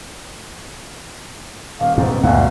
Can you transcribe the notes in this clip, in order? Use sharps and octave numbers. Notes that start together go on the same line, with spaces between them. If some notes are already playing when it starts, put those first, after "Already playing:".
D#1 F5
G#2 B2 C4
G1 D2 G#2 B2 F5 F#5